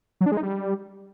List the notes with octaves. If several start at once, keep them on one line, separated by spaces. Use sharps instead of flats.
F#3
D4
G#3
D#4
G3